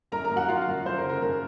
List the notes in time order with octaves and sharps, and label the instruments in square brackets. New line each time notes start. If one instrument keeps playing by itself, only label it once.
[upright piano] F#2 A#4 A#5
A#4 A#5
F#2
F#4 F#5
F#2 F4 F5
F#2
F#2 C5
A#4
C#3
A#4
F#2 A#4